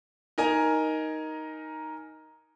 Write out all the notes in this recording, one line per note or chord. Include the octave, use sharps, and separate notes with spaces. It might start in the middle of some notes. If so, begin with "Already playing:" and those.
D#4 A#4 G#5 A#5